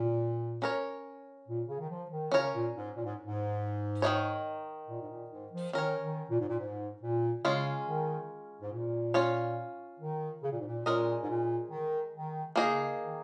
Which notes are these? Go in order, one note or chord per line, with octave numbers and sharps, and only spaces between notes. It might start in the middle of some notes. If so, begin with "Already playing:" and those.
Already playing: A#2
C#4 A#4 C#5
A#2
C#3
D#3
F3
D#3
C#3 C#4 A#4 C#5
A#2
G#2
A#2
G#2
G#2
D#3 A#3 D#4 C#5
A#2
G#2
A#2
G#2
F3
D#3 C#4 A#4 C#5
D#3
A#2
G#2
A#2
G#2
A#2
C#3 G#3 C#4 F4
D#3
G#2
A#2
C#4 F4 C#5
D#3
C#3
A#2
G#2
A#2
A#2 G#3 C#4 A#4 D#5
G#2
A#2
D#3
D#3
C#3 A#3 D#4 G#4 D#5
D#3